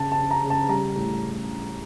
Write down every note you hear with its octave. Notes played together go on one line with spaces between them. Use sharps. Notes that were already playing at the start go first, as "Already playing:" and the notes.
Already playing: C#3 A5
A5
C#3
A#5
C#3
A5
G3 A#5
A2